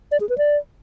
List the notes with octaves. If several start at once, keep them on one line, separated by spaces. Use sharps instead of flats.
D5
G#4
B4
D5